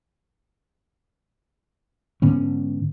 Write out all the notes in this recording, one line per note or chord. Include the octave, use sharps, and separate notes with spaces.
G#2 D3 B3 C#4